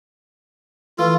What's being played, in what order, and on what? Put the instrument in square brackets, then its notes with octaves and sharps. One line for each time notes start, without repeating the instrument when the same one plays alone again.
[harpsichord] E3 A3 [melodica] F4